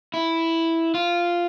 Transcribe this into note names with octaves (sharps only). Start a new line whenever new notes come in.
E4
F4